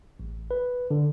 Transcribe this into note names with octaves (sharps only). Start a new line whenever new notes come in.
A1
B4
D3